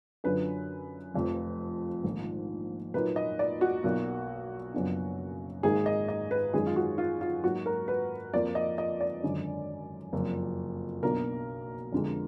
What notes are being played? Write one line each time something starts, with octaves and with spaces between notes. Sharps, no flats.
F#2 D3 F#3 D4 F4 B4
F1 F2 F3
A#1 G#2 D#3
A#2 F#3 A#3 D#4 B4
D#5
D5
F#4
B1 B2 A#3 F4
F#1 F#2 F3 B3 D4
G#1 G#2 D#3 A#3 D#4 G#4
D#5
D#5
B4
F#2 D#3 G#3 G#4
F4
F#4
F4
F4
G#2 F#3 A#3 F#4
A#4
B4
F2 F3 A#3 D5
D#5
D#5
D5
G#1 F#2 D3
F#1 F2 F3
B1 B2 A#3 D4 A#4
F2 D3 G#3